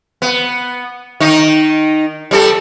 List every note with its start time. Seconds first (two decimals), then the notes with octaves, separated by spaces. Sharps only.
0.22 B3
1.20 D#3 D#4
2.31 G3 G#3 A4